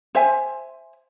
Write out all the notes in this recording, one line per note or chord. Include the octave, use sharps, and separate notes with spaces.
C5 E5 G#5